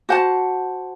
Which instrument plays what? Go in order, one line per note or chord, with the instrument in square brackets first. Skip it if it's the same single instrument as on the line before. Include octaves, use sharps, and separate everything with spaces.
[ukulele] F#4 C5 F#5 A5